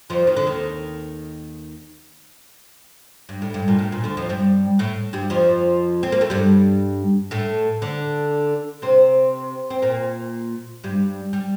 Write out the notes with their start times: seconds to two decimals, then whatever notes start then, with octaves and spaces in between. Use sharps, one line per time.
0.10 F2 F3
0.27 D#3
0.37 D3
0.46 D#2 D#3
3.29 G2
3.42 A2
3.54 G2
3.68 A#2
3.79 A2
3.92 A#2
4.04 D2 D3
4.17 F2 F3
4.29 G2 G3
4.79 A2 A3
5.13 G2 G3
5.30 F2 F3
6.03 C4
6.12 A#3
6.21 A3
6.30 G2 G3
7.31 A2 A3
7.82 D3 D4
8.82 C3 C4
9.70 C4
9.82 A#2 A#3
10.84 G2 G3
11.33 G3